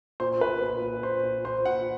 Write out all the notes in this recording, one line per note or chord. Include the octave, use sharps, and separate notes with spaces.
A#2 C5
A#2 B4
A#2
A#2
A#2 C5
A#2
A#2 C5
A#2 F#5